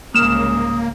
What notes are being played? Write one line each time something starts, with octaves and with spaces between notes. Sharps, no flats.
C2 G#2 C#3 A#3 D#6 F6 E7